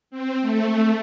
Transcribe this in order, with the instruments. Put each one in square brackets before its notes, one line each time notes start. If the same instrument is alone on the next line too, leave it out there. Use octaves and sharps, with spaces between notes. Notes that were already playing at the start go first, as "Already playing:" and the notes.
[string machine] C4
A3